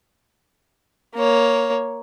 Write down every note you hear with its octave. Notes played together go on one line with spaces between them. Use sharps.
A#3 C#5